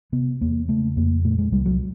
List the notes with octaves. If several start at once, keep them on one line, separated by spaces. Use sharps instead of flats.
C3 B3
E2 A#3
C#3 A3
F2 A#3
A#2 A3
G#3
C2 G3
F#3